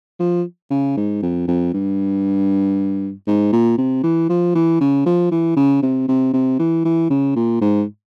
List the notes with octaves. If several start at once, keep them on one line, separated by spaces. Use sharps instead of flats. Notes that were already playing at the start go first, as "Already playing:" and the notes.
F3
C#3
G#2
F2
F2
G2
G#2
A#2
C3
E3
F3
E3
C#3
F3
E3
C#3
C3
C3
C3
E3
E3
C#3
A#2
G#2